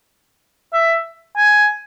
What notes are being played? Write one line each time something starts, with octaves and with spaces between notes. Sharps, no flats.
E5
G#5